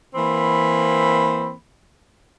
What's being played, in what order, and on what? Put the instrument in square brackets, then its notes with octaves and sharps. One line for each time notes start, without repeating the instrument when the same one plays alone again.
[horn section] E3 A#3 C4 B5